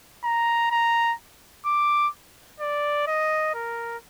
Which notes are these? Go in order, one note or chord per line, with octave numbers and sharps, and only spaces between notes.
A#5
A#5
D6
D5
D#5
A#4